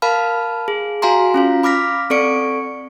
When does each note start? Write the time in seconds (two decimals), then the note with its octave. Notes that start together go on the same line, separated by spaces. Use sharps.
0.02 A#4 F5 A5 B5 F6
0.68 G#4
1.02 F#4 F5 G#5 A#5 C6
1.34 C#4 F4 F5
1.63 B5 D6 F6 A#6 B6
2.10 C4 A4 D5 C#6 C#7 D7